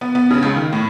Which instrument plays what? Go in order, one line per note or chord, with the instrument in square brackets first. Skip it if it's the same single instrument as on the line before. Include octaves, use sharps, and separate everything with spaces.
[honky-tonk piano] B3
B3
C#3
C#2
D#3
A2